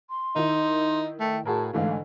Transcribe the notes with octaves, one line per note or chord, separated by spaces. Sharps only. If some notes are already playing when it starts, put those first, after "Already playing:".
C6
D#3 D#4 E4
A3 G5
A2 F#4 G#4 A#4 A5
G#2 D3 E3 A3 F5